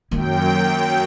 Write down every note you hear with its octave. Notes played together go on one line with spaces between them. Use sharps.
F#2 D#3 A#3 G5